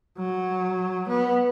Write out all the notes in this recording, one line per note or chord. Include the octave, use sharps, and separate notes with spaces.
F#3
B3